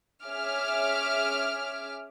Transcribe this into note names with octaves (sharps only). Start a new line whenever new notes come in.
C#4 G#4 E5 D6 F6